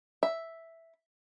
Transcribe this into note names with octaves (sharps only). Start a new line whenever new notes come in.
E5